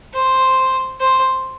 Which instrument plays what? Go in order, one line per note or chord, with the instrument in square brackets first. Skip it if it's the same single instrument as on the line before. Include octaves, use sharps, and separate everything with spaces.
[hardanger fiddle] C5
C5